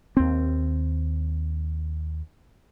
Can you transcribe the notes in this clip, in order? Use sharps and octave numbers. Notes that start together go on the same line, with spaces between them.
D#2 C4